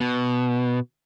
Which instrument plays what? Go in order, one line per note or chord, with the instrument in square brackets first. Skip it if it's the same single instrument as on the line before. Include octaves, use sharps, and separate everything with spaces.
[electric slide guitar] B2